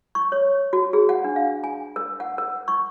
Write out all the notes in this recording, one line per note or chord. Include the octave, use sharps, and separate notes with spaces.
C#6
C#5
F#4
G#4
F#5
D4
F5
G#5
A#4
F#5
A#4
C#6